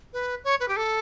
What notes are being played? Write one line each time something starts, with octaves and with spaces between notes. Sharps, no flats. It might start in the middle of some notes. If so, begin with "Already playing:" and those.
B4
C#5
B4
G4
A4